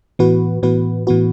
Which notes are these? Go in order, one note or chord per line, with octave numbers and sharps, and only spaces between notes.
A2 E3 B3 F#4 B4
A2 E3 B3 F#4 B4
A2 E3 B3 F#4 B4